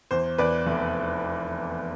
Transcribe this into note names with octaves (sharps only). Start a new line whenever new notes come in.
E2 C5
E2 B4 D5
F1